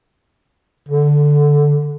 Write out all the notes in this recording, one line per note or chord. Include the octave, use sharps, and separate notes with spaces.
D3